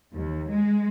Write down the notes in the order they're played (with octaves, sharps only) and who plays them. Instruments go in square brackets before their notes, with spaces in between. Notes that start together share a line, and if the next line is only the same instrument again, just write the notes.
[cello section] D#2
G#3